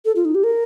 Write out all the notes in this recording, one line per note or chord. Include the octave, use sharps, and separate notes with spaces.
A4
F4
D#4
G4
A#4